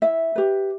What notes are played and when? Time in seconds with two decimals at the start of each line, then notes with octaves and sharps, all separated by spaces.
0.02 E4 E5
0.36 G4 B4